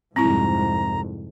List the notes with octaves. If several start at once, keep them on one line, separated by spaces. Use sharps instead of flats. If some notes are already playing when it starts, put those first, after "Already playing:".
C2 F2 G#2 C4 E4 A#5